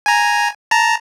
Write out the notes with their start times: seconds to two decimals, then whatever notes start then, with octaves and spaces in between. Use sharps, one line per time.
0.06 G#5 A#5
0.71 A5 A#5